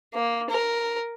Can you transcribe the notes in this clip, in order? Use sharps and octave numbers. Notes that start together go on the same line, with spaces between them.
A#3
A#4